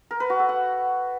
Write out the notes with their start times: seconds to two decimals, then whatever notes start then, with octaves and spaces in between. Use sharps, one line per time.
0.11 A#4
0.20 B4
0.30 F#4
0.39 A4
0.49 F#5